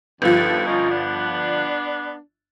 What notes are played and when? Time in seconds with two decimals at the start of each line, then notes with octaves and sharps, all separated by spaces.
0.22 G1 D#2 F3 A4 B4
0.65 C#4 D#4 F4
0.91 B3 D4